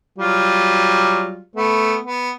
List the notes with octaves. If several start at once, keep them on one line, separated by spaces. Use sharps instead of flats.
F#3 G3 F4
A3 B3
B3